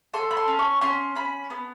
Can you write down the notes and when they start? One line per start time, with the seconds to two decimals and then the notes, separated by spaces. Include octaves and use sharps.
0.14 A4 C6
0.31 B5
0.37 C6
0.48 C#4
0.59 C#6
0.81 C#4 C6
1.15 C#4 B5
1.50 B3